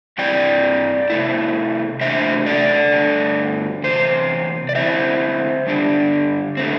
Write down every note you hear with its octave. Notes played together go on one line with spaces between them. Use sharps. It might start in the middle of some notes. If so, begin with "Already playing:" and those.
G2 G3 C4 E4 D5 G5
C3 A3 E4
C3 A3 D4 C5 E5
A4 D5
G2 D3 A3
E2 C3 C5
D5
D3 C4 E4 C5 E5
G2 D3 G3 D4
D3 A3 C4